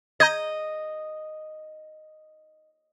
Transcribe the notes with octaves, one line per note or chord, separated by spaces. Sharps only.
D#5 A#5 G6 G#6